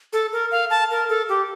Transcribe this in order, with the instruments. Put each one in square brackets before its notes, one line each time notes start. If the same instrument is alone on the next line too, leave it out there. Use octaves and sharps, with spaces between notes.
[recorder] A4
A#4
F5
A5
A#4
A4
G4